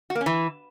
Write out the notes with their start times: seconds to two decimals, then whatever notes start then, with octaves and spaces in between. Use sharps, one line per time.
0.10 F#4
0.15 A#3
0.21 C#4
0.26 E3